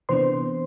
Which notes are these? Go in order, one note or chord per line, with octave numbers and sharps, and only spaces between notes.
C3 E3 B3 D4 C5 C6